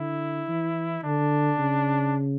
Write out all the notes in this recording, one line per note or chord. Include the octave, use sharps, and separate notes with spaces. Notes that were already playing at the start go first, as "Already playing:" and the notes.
Already playing: D3 E4
E3
D3 D4
C#3